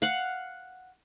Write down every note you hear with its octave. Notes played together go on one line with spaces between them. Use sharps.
F5 F#5